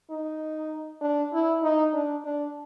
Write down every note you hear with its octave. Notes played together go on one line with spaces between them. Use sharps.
D#4
D4
E4
D#4
D4
D4